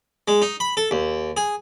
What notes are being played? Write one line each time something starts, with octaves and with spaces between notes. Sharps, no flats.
G#3
D#4
B5
A4
D#2
G#4